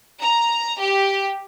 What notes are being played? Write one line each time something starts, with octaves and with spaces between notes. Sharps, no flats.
A#5
G4